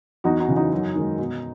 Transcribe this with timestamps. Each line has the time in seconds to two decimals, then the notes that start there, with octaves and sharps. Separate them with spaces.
0.24 E2 D#4 F#4
0.40 D#4 F#4
0.49 C#3 E3
0.56 D#4 F#4
0.72 F#2
0.95 D#3 G#3
1.18 B2